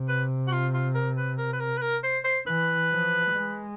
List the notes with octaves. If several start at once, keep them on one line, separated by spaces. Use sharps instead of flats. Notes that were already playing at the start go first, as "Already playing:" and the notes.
Already playing: C3
B4
F#4
F4
F4
A#4
B4
A#4
B4
A#4
B4
A#4
C5
C5
E3 B4
F3
G#3